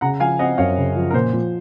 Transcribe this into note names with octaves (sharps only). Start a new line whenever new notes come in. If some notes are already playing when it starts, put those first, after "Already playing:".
C#3 F#5 A#5
F3 F5 G#5
C4 D#5 F#5
F#2 C#5 F5
C#3
F3
A#4
A#2 C5
F3